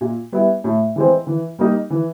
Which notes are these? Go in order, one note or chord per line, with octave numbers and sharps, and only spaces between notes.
A#2
G3 B3 E4
A2
E3 G#3 C4
E3
G3 A#3 D#4
E3